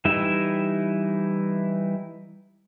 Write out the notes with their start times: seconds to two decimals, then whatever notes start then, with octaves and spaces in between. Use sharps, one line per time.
0.05 E3 G3 D#4 E4 E5